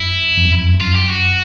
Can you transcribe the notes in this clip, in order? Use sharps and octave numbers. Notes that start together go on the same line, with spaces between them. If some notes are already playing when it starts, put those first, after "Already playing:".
Already playing: F#2 E4
F2
F#2
F2
F2
F#2 F4
G4
F#4